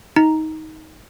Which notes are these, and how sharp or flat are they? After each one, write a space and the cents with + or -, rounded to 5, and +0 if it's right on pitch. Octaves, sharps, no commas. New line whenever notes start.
D#4 +20 A#5 +0